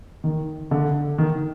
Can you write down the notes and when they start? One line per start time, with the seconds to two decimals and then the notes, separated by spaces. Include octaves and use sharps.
0.24 D#3
0.71 D3
1.18 D#3